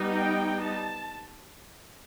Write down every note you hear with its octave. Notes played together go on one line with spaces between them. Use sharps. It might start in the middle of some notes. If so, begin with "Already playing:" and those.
Already playing: G3 B3 D#4
G5
A5